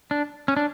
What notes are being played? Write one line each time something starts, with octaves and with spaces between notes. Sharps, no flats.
D4
C#4
D4